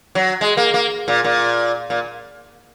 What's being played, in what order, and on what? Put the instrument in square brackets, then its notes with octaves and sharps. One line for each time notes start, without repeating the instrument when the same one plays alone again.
[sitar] F#3
G#3
A#3
A#3
A#2
A#2
A#2